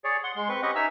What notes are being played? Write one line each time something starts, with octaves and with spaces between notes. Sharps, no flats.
G#4 C#5 D5
F#5 C6
G#3 C6
C4 B4 C#6
C#4 G4 B4 D#5 F#5 C#6
D#4 E5 G#5 E6 F6